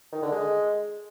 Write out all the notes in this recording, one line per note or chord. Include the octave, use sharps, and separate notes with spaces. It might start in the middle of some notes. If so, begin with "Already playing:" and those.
D#3
D3
G#3